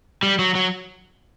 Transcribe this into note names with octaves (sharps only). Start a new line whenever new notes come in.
G3
F#3
F#3